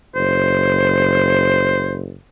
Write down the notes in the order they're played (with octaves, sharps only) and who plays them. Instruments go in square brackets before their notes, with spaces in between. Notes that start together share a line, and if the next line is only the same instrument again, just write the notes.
[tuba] F#1 [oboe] C5